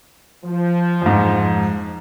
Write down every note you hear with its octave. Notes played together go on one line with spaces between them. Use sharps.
F3
F2 G#2